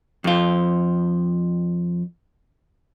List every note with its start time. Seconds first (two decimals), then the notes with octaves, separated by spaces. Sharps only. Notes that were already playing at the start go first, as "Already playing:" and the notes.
0.24 F2 F4